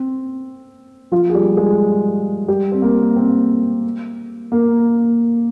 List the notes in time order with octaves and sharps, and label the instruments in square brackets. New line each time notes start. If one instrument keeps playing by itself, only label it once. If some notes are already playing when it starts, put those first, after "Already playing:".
Already playing: [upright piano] C4
F3 F4
G#4
G3 G4
G#3 G#4
G3 G4
C4
A#3
C4
A#3